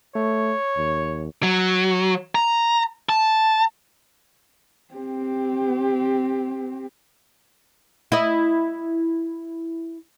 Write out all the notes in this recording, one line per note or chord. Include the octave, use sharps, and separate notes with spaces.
A3 C#5
D#2
F#3
A#5
A5
C4 G4
E4 D#5